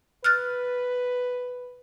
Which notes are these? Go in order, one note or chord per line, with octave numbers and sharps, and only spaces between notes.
B4 F6 F#6 A6